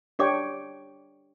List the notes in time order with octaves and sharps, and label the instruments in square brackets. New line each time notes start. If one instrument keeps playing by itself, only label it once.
[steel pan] D4 C#5 G5 [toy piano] G4 D5 D6